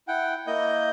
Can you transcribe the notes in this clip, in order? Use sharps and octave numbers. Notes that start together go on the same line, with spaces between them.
E4 F#5 G5
A#3 E4 D#5 G6